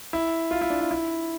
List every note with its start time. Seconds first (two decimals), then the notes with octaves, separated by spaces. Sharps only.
0.13 E4
0.51 F4
0.61 E4
0.70 D4
0.81 E4
0.91 E4